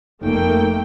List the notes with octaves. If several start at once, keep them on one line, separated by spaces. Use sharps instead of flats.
F1 A3 A#3 D#4 G5